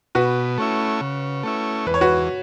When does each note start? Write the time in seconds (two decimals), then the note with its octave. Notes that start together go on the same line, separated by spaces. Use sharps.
0.15 B2 F#4 B4
0.58 A3 C#4 E4
1.01 C#3
1.43 A3 C#4 E4
1.86 E2 B4
1.94 C#5
2.01 F#4 B4